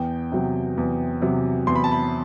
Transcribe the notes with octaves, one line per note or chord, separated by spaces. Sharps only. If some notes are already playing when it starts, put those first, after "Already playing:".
Already playing: E2 G5
C3 F#3
E2
C3 F#3
E2 C6
B5
A5
B5